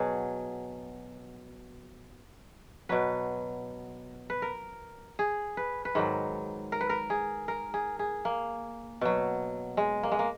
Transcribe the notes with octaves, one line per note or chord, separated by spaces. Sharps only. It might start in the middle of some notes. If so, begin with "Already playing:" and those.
Already playing: B2 F#3 G#4
B2 F#3 B4
B4
A#4
G#4
B4
B4
G#2 D#3 F#3
A#4
B4
A#4
G#4
A#4
G#4
G#4
A#3
B2 F#3
G#3
A#3
G#3
A#3